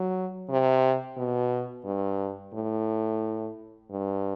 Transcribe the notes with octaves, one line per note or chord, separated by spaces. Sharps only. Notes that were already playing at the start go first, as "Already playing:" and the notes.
Already playing: F#3
C3
B2
G2
A2
G2